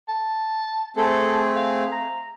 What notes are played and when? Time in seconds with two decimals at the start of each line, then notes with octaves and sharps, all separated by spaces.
0.08 A5
0.97 A3 C4 G#4 A4
1.56 F5
1.92 A#5